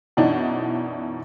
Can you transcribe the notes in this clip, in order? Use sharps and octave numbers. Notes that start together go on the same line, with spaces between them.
F#2 B2 E3 D4 D#4